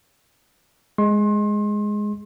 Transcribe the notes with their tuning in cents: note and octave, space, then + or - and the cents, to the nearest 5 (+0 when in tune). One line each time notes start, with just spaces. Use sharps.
G#3 +0 C6 +30